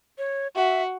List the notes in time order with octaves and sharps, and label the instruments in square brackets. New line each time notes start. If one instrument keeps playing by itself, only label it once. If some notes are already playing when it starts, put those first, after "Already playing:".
[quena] C#5
[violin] F#4 [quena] E5